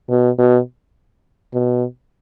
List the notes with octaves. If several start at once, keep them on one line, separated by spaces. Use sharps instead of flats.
B2
B2
B2